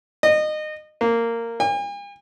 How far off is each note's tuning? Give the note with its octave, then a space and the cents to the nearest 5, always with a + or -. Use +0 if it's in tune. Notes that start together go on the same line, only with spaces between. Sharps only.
D#5 -25
A#3 -15
G#5 -45